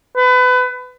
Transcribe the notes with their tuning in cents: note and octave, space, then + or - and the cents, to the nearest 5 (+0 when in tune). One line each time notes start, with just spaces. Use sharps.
B4 +25